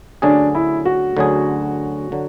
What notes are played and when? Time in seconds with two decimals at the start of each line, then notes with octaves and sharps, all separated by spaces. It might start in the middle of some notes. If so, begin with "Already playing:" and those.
0.22 D2 D3 F#3 C#4 D4 G#4
0.55 E4
0.85 F#4
1.17 D2 D3 F#3 C#4 G#4
2.12 D3 F#3